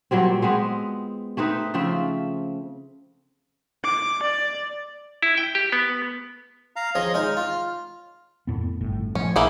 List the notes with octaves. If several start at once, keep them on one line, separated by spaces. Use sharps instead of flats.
A#2 F#3 G3 C4
G#3 B3 C4 B4
A3 C4 D#4 B4
C#3 F3 C4 E5
D6
D5
E4
G5
G4
B3
F5 A#5
F3 C#4 G#4 D#5
G#3 C#4 D#4 F6
F4
F2 A2 B3
G1 A2
A2 F3 C#4
A#1 A#3 E4 G#4